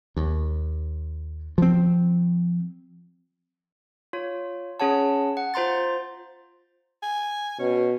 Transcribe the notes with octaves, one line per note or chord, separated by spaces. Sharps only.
D#2
F3 C4
F4 C#5
C#4 G#4 C#5 F#5 A5
F#5
F4 C5 A#5 C6 A6
G#5
B2 C#4